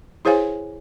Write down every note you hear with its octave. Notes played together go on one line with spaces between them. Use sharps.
E4 G#4 C5 C#5 F5 G#5